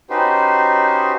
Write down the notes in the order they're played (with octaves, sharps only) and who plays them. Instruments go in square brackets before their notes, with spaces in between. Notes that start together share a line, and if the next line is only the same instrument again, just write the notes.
[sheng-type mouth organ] C#4 D#4 F#4 G4 B4 C5